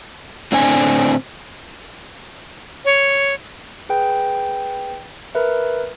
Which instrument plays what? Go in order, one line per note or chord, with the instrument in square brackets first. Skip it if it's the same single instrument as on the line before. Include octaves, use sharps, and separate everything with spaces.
[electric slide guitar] A2 D3 C4 D4 G#5
[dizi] C#5
[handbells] G#4 B4 G5
A#4 B4 E5